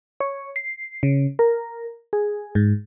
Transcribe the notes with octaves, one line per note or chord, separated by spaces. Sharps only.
C#5
C7
C#3
A#4
G#4
G#2